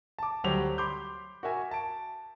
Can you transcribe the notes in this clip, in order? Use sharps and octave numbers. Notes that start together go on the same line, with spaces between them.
A5 D6
D2 F#3 G3 G4 C5 F7
B5 C6 D6 G6
F#4 A#4 E5 G#5
A5 D7